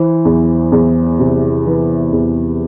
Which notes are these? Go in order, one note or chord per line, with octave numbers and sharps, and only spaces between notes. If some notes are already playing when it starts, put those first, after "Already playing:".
Already playing: E3 C5
E2
E2
C3
E3 B4
E2